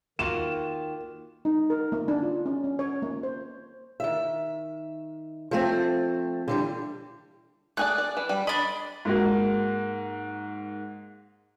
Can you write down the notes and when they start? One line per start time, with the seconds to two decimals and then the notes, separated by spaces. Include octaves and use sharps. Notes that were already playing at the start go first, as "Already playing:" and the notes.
0.19 D#3 A#3 F4 F#4 E7
1.45 D#4
1.70 A#4
1.92 A#3
2.08 D4
2.22 F4
2.46 C#4
2.64 C#4
2.79 C#5
3.02 A#3
3.23 C5
4.00 D#3 E5
5.51 F3 A3 C4
6.48 D3 E3 G3
7.77 A3 G#4 D5 F#6
7.98 D5
8.17 E3
8.29 G3 B5
8.47 D4 D#5 B5
9.05 G#2 A#3 F#4